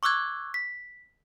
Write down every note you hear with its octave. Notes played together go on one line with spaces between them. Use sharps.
C#6 D6 E6 F#6 G#6
B6